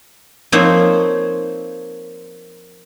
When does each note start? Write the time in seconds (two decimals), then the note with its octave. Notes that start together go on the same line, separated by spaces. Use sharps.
0.52 F3 A#3 C4 D#4 C5 C#5